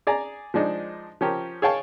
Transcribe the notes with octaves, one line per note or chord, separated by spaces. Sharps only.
G#4 D5 G#5 A#5
F3 G#3 D4 D#4
F3 C#4 G4 A#4
G#4 C#5 F5 G5 A5